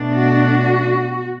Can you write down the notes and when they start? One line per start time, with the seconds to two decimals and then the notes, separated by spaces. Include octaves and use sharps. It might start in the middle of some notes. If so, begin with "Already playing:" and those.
Already playing: B2 A3 D4
0.16 F#4